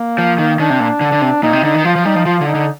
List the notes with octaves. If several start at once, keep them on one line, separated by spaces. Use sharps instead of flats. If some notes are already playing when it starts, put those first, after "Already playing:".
Already playing: A#3
F3
D#3
D#3 D4
C3
A#2
D3
D3
C3
A#2 D#4
C3
D3 D#4
D#3
F3 F4
F3
G3 D#4
F3
F3 F4
D3
D#4
D3